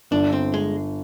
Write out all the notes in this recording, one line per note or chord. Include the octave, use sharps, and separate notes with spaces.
G1 D4
C4
G#3